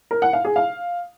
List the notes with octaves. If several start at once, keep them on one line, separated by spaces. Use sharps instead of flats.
A#4
F#5
F5
G#4
F5